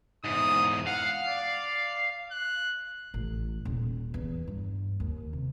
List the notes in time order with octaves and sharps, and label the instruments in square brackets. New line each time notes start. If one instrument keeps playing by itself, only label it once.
[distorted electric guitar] E2 G#2 [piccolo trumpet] D#6
[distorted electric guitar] F5 [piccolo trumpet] F#5
[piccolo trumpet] D5
F#6
[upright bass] A1
D#1
E2
G2
D#2
C3